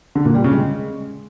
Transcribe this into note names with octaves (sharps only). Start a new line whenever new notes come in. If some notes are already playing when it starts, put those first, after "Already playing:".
D3
A#2
G3
C#3
G#3